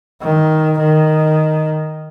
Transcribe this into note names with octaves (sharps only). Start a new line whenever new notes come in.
D#3
D#3